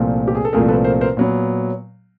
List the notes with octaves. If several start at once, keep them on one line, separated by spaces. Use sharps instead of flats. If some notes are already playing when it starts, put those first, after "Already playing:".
Already playing: C2 A#2 F3 A3 C4
G4
G#4
A4
C2 A#2 F3 A3 C4 G#4 A#4
A4 B4
A#4 C5
A#4 C5
A#2 F#3 B3